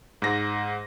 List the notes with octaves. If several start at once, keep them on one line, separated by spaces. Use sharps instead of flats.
G#2 A#6